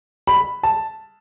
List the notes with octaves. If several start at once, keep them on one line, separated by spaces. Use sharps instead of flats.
B5
A5